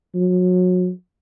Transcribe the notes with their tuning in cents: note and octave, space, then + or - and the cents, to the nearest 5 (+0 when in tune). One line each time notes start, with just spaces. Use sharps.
F#3 -30